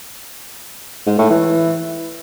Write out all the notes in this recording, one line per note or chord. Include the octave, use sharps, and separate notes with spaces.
G#2
A2
E3